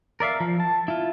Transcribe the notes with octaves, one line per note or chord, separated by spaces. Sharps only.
A#4 D5 E5 F5
F3
A5
E4 F4